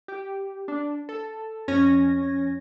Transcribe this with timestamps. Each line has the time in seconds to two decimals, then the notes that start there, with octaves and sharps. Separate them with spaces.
0.08 G4
0.68 D4
1.09 A4
1.68 F2 C#4 G#6 A#6